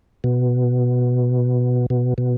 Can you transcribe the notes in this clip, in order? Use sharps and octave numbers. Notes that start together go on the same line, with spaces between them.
B2
B2
B2